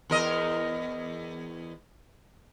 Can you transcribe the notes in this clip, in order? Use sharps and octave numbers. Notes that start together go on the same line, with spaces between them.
E2 A#4 D#5